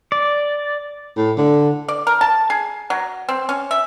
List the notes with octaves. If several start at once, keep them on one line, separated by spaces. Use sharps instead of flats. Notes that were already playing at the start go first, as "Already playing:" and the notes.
D5
A2
D3
D5
A#4
A5
G#4
F#3
C4
C#4
E5